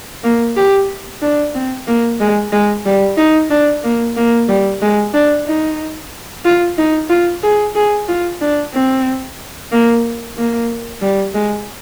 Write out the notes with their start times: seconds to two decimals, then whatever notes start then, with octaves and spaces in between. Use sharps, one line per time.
0.24 A#3
0.56 G4
1.22 D4
1.54 C4
1.87 A#3
2.20 G#3
2.52 G#3
2.85 G3
3.17 D#4
3.50 D4
3.84 A#3
4.16 A#3
4.48 G3
4.82 G#3
5.14 D4
5.46 D#4
6.45 F4
6.78 D#4
7.09 F4
7.43 G#4
7.75 G#4
8.08 F4
8.41 D4
8.74 C4
9.72 A#3
10.37 A#3
11.01 G3
11.34 G#3